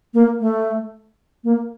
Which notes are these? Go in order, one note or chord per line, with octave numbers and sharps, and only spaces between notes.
A#3
A3
A#3